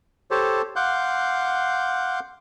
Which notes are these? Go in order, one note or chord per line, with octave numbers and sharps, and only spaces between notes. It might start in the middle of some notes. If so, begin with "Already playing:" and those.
G4 A4 C5 C#5 A5
F5 F#5 C6 D6 F#6 G6